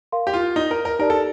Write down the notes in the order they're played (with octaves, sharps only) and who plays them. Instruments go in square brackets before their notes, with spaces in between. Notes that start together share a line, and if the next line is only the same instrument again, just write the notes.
[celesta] A#4 F5 C6
[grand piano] G4
F4
D#4
A#4
A#4
[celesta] D#4 G4 D5 A5 [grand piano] A#4
[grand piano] A4